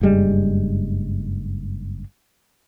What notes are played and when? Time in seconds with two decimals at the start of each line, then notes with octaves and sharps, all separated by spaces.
0.01 F#1 G2 G3 G#3